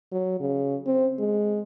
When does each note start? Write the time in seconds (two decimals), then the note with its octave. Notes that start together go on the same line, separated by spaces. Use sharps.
0.12 F#3
0.41 C#3
0.86 C4
1.19 G#3